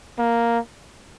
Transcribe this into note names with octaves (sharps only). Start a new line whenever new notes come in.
A#3